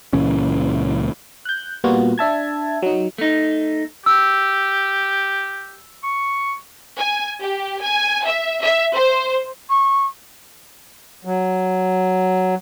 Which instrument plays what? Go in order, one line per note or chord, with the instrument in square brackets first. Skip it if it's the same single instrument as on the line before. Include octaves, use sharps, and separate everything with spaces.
[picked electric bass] C#2 A#2 E3 C#4
[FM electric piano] F#6 G6
A#2 G3 A#3 B3 F4 F#4
D4 E5 A5 G#6
F#3 D#4
[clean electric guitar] A3 D#4
[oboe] G4 [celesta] E6
[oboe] C#6
[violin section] G#5
G4
G#5
E5
E5
C5
[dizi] C#6
[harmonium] F#3